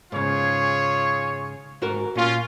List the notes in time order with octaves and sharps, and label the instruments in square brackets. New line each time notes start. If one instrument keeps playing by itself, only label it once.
[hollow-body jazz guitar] G#2 C#3 [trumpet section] F4 G#4 C#5
[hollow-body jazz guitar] G#2 F#4 A#4
[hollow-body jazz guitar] A#2 [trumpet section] C#4 F4